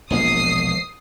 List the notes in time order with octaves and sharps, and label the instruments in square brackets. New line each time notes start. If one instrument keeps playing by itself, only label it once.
[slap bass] E1 A#1 A#3 [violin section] D#6 C7